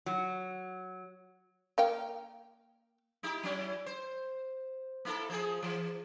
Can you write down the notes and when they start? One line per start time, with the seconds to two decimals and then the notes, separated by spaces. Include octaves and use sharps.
0.06 F#3
1.78 A#3 F5 G5
3.23 D#4 E4 G4
3.43 F#3 C#4 E4
3.86 C5
5.05 A#3 E4 A4
5.30 F3 G#4
5.62 E3